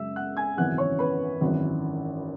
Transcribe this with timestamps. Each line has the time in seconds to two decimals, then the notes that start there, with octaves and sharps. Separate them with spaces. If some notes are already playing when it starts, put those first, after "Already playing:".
Already playing: F#2 C#3 G#3 E5 E6
0.16 F#5 F#6
0.37 G#5 G#6
0.57 G#1 F#2 C#3 E3 B3 F#5 F#6
0.78 C#5 C#6
0.99 B4 B5
1.41 G#1 F#2 E3